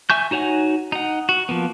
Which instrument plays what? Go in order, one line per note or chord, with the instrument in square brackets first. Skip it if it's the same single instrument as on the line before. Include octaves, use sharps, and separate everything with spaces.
[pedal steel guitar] E5 G#5 C#6 G6
D#4 F#4 C#5 F#5 G#5
D#4 F#5
F#4
F3 A#3 B3